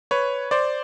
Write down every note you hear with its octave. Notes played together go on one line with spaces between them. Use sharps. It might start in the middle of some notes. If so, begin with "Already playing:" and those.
B4 C#5
C5 D5